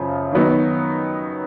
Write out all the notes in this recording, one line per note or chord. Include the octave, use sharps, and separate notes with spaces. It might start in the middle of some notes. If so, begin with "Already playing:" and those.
Already playing: F#2 C#3 F3
D#3 F#3 B3 D#4